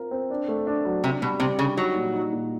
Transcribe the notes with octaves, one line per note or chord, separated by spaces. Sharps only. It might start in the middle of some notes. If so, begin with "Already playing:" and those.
Already playing: C4 F4 A#4
C4
D4
A3
D4
F#3
C3 D4
B2 G3
C3 G3
C#3 D4
F#3 D#4
A#2
D#4
A#2